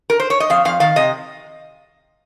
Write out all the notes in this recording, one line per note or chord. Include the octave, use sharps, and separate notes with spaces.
A#4
C5
C#5
D#5
F2 F5
F2 F5
D#3 F5
C3 D#5